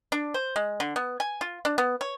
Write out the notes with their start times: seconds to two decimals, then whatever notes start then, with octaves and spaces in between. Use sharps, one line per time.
0.12 D4
0.34 C5
0.56 G#3
0.80 D3
0.96 B3
1.20 G#5
1.41 F4
1.65 D4
1.78 B3
2.01 C#5